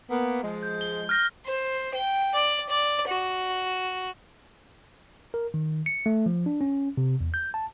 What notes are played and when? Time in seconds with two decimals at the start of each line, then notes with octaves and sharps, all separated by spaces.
0.10 A#3 B3
0.43 F3 G#3
0.63 G6
0.81 G7
1.09 F6 G6 A#6
1.46 C5
1.94 G5
2.34 D5
2.69 D5
3.08 F#4
5.34 A#4
5.54 D#3
5.86 C#7
6.06 A3
6.26 F3
6.46 D4
6.61 C#4
6.97 C3
7.21 E2
7.34 G6
7.54 A5